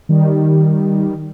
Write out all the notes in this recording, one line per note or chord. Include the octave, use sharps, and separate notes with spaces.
D#3 G3